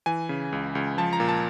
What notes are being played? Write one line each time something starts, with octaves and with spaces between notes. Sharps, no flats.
E3 G#5
C#3
C#2
C#2
F3 A5
A#5
A#2
A5